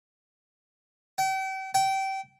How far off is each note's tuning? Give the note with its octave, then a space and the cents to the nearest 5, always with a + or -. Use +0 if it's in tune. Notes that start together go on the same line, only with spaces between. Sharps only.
G5 -40
G5 -25